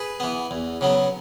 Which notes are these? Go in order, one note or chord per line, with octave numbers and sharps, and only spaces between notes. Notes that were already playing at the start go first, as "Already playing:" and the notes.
Already playing: G#4 B4
E3 B3
E2
C#3 F#3 B3